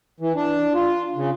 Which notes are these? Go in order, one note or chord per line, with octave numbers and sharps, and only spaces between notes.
E3
D4
F4
C#3